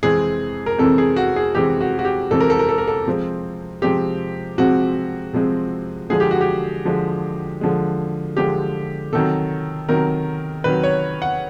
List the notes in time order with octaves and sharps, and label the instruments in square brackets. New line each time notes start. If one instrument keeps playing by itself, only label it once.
[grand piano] F2 C3 E3 G#3 C4 G#4
A#4
F2 C3 E3 G#3 C4 A4
G#4
F#4
G#4
F2 C3 E3 G#3 C4 G4
F#4
F#4
G4
F2 C3 E3 G#3 C4 A4
A#4
A4
A#4
A4
A#4
A4
C3 F3 G#3 C4
C3 F3 G#3 C4 G4
C3 F3 G#3 C4 F#4
C3 F3 G#3 C4
D3 F3 G#3 G#4
G4
F#4
G4
D3 F3 G#3
D3 F3 G#3
D3 F3 G#3 G4
C3 D#3 F#3 A4
C3 D#3 F#3 A#4
C3 D#3 F#3 B4
C#5
F#5